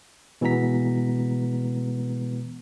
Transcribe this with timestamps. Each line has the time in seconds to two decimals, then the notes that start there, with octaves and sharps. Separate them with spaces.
0.41 B2 E3 G#3 B3 A#5 B6